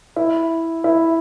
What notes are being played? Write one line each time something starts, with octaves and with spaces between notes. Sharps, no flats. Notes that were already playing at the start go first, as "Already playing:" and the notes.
E4
E4